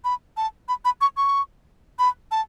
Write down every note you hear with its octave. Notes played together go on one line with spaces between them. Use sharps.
B5
A5
B5
B5
C#6
C#6
B5
A5